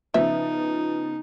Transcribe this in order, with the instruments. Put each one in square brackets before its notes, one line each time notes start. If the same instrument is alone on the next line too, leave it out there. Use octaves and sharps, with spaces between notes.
[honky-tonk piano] C#3 F3 B3 [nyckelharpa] D#4 [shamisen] E5